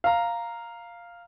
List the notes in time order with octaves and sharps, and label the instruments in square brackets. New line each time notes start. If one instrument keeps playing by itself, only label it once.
[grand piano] F5 A#5